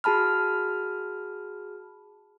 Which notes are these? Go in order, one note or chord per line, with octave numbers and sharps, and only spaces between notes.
F#4 G#4 A5 B5 F6